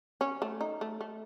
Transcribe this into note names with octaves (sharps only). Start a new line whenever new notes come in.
C#4
A3
D#4
A3
A3